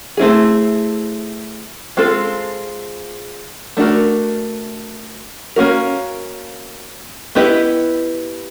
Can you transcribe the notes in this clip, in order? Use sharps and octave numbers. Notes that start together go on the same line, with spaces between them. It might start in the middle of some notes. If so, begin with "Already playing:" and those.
A3 C4 E4 G#4
G#3 C4 F4 A4
A3 D4 F#4 A#4
A#3 C#4 F#4 A#4
B3 E4 G4 B4 D#5